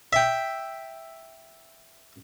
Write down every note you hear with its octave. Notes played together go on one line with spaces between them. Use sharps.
E5 G5